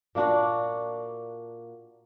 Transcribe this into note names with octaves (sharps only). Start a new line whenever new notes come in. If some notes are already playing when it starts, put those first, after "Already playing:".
A#2 A#3 D4 F#4